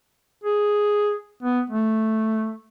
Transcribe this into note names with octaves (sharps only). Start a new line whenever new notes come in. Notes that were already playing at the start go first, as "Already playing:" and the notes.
G#4
B3
A3